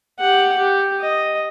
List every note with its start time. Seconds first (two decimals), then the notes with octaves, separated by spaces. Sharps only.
0.19 G4 F#5
0.57 G4
1.00 D#5